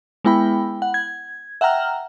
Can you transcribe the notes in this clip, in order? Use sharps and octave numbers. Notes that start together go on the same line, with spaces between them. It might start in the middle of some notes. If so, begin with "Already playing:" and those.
G#3 B3 E4 G5 B5
F#5
G#6
E5 F#5 G5 A#5 F6